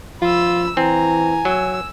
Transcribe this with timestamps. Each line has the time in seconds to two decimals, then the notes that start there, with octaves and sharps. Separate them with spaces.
0.22 F3 F4 B5 E6
0.77 E3 C4 G#5 A#5
1.45 F#3 E6